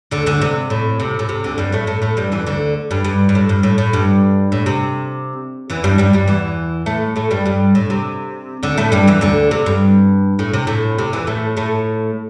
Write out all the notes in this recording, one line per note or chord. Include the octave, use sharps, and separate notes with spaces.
D2 D3
D2 D3
C3
A2
C3
A2
C3
D2 D3
G2 G3
A2 A3
A2 A3
A2 A3
G2 G3
E2 E3
D2 D3
G2
G2
G2
A2
G2
A2
A2
G2
A2
C3
E2 E3
G2 G3
G2 G3
G2 G3
E2 E3
A2 A3
A2 A3
G2 G3
G2 G3
A2
C3
D2 D3
A2 A3
G2 G3
E2 E3
D2 D3
C3
G2
A2
C3
A2
C3
E2 E3
A2 A3
A2 A3